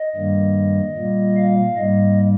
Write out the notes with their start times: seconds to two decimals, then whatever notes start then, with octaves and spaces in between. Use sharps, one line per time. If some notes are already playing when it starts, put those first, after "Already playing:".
Already playing: D#5
0.15 G2 D#3 G3 A#3
0.96 A#2 G3 A#3
1.36 F5
1.76 G#2 G3 A#3 D#5